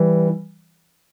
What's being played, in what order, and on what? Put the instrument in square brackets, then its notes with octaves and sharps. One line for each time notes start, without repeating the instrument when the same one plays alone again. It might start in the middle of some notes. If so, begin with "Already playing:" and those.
Already playing: [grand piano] E3 G3